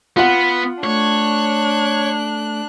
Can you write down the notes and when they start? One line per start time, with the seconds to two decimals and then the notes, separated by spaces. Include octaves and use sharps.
0.17 B3 F4 F#5
0.84 A3 D4 C#5 F#6